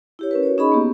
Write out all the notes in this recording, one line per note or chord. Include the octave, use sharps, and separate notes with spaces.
E4 G4 C#5
C#4 A#4 B4
F#4 C#5
C#4 D#4 G#4 D#5 B5 C#6
A#3 B3 G4